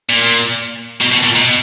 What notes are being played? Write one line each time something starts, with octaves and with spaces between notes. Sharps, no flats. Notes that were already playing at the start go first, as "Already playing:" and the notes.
A#2
B2
B2
A#2
B2